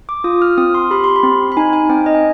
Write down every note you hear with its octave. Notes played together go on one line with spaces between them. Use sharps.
D6
F4 D#6
F6
C4 D#6
C6
G4 B5
C6
B5
C4
B5
D#4 G#5
G#5
C4 G5
D#5
G#5